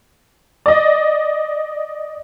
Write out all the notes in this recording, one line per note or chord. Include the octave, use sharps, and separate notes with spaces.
D5 D#5